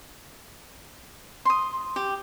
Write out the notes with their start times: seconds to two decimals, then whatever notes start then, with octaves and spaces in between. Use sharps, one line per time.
1.45 C6 D#6
1.96 G4